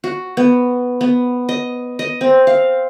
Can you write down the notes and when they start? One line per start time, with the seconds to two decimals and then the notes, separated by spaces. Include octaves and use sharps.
0.04 F#4
0.37 B3
1.01 B3
1.49 D#5
1.99 D#5
2.21 C4
2.47 F5